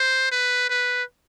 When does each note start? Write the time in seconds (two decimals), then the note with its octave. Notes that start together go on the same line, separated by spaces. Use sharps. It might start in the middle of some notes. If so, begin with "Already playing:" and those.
Already playing: C5
0.32 B4
0.69 B4